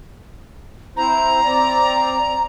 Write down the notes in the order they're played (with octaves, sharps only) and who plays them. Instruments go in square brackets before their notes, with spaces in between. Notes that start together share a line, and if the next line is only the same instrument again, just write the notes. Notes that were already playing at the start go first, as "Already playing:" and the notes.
[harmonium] C4 E4 C5 [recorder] A#5
[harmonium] C4 D5